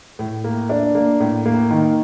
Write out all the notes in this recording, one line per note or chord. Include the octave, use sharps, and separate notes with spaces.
A2
A#3
D4
A#3
A2
A#3
D#3